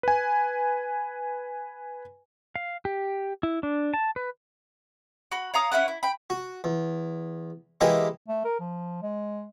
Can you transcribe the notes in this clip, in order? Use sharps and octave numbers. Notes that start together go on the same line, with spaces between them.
B4 G#5
F5
G4
E4
D4
A5
B4
F#4 B5
C#5 F5 A#5 D#6
C#4 E4 B4 F#5
E4
G5 B5
F#4
E2
E3 G#3 A#3 E4 G4 D#5
A3
A#4
F3
G#3